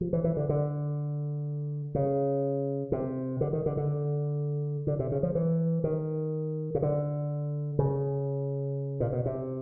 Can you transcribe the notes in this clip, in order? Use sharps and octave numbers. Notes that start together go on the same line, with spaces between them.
F3
E3
E3
D3
D3
C#3
C3
D3
D#3
D3
D3
D3
C3
C#3
F3
E3
D#3
C#3
D3
C#3
A#2
B2
C3